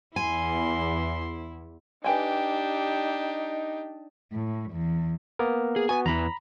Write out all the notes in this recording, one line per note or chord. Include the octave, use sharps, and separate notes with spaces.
E2 E4 G#5 C6
D4 D#4 G4 B4 G5 G#5
A2
E2
A#3 B3 A#4
G#4
B3 F#4 G#5
E2 E3 A#5 B5